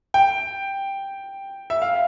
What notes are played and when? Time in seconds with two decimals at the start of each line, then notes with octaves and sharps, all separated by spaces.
0.14 G5
1.70 E5
1.82 F5